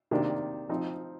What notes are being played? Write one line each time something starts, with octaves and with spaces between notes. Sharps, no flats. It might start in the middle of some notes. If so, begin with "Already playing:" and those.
C3 D#3 A#3 D4
F3 C4 D#4